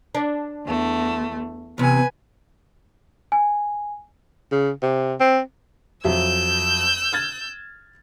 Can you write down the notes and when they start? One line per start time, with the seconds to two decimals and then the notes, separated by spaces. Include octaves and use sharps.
0.15 D4
0.65 E2 A3
1.78 E2 C3 B4 G#5
3.32 G#5
4.52 C#3
4.83 C3
5.20 C4
6.05 F2 F#3 E5 E6 G6
7.13 F6 G#6 A6